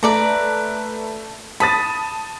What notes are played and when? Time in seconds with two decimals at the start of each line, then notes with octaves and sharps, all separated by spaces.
0.03 A3 B4 D5 A#5
1.60 A5 B5 D#6 A6